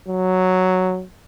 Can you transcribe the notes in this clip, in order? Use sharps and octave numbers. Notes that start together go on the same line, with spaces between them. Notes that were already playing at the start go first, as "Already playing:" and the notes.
F#3